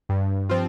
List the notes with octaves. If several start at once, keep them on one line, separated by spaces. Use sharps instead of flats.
G2
F3 C4 F4